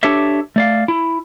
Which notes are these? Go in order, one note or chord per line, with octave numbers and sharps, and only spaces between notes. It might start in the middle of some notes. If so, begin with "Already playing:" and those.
D4 G4 A4 C#5 E5
A3 D5 F5
E4